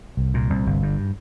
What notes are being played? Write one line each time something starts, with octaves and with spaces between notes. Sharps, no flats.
C2
A#2
C2
G1
G2